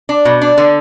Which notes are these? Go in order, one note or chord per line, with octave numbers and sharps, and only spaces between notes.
D4
B2
D4
D3